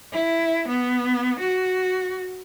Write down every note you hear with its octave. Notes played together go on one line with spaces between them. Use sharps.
E4
B3
F#4